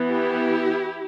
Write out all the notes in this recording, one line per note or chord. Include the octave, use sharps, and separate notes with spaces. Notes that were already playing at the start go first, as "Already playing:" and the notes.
Already playing: E3 B3
E4 G4